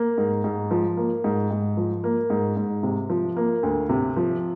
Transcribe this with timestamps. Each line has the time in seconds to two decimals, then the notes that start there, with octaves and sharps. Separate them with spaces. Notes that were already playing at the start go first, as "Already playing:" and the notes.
Already playing: A#3
0.18 G#2
0.44 G#2
0.71 F3
0.97 A#3
1.24 G#2
1.50 G#2
1.77 F3
2.04 A#3
2.30 G#2
2.57 G#2
2.83 C3
3.09 F3
3.37 A#3
3.63 D2
3.89 C3
4.16 F3